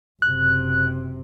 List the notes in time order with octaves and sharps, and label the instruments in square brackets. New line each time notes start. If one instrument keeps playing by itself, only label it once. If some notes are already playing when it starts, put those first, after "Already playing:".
[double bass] F#1 C3 [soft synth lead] F#6